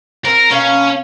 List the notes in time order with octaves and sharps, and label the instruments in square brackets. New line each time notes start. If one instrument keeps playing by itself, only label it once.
[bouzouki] C4 [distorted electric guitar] A#4
[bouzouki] B2 A#3 F5 [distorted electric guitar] C#4